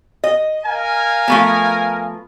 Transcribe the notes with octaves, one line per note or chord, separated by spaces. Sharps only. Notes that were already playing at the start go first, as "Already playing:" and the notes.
D#5
A#4 F5 G#5
F3 A3 B3